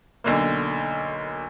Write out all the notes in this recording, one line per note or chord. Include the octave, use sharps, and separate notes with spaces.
B1 D3 A#3